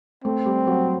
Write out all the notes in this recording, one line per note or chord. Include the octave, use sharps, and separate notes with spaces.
A3 C4
G3
F#3